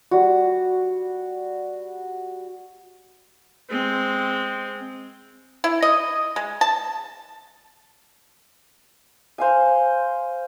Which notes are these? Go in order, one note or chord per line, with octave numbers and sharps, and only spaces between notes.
G3 F#4
G#3 C4
E4
D#5
G#3
A5
C5 F5 G#5